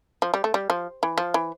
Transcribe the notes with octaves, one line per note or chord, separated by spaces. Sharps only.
F3
G3
A3
G3
F3
E3
F3
E3